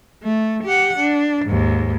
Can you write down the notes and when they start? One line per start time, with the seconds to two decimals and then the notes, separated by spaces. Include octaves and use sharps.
0.23 A3
0.64 G4 F#5
0.98 D4
1.46 D#2 G#2